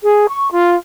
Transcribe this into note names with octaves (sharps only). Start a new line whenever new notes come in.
G#4
C#6
F4